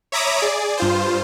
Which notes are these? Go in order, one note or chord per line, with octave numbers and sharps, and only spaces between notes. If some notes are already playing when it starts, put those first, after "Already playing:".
C#5 E5 A#5 B5 D6 D#6
G#4 D5
G2 F4 C5